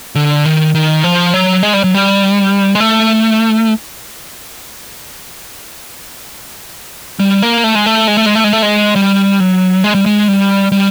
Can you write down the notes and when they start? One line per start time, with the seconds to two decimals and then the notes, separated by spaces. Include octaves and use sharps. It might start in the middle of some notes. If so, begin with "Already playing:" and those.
0.15 D3
0.46 D#3
0.75 D#3
1.04 F3
1.34 F#3
1.63 G#3
1.73 G3
1.84 F#3
1.94 G3
2.75 G#3
2.80 A3
7.20 G3
7.43 A#3
7.64 A3
7.75 G#3
7.86 A3
8.07 G#3
8.17 A3
8.26 G#3
8.35 A3
8.44 G#3
8.53 A3
8.63 G#3
8.96 G3
9.40 F#3
9.84 G#3
9.95 G3
10.06 G#3
10.28 G3
10.72 G3